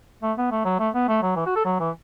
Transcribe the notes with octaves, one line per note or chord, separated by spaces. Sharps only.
A3
B3
A3
F#3
A3
B3
A3
F#3
E3
F#4
A4
F#3
E3